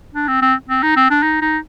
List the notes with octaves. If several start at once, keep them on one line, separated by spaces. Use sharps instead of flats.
D4
C4
C4
C4
D#4
C4
D4
D#4
D#4